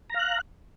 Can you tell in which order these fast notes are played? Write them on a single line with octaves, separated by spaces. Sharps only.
A#5 F5 F#6